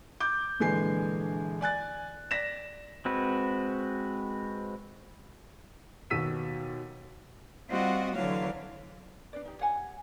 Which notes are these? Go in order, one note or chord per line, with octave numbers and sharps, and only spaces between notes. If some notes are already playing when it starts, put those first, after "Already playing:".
D6 G6
A#1 D3 E3 G#3 G#5 C7
D5 G#5 F#6 A6
D5 A#6 B6 E7
G#3 C4 F#4 B4
D#2 B2 E6 B6 D#7
G3 C4 F4 F#4 D#5 F#5
D3 E3 F#3 C#5 F5
D4 B4 D5
D#4 G4
G4 C#5 F#5 G#5